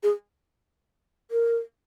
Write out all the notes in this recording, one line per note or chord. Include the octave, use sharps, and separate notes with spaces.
G#4
A#4